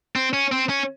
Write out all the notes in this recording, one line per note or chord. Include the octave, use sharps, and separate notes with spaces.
C4
C#4
C4
C#4